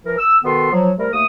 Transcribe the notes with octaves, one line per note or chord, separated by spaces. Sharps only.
E3 F3 A#4
E6
B2 D#3 B3 A4 C6
F3 F#3
C3 G3 A3 A#4
D#2 A3 A#3 D#6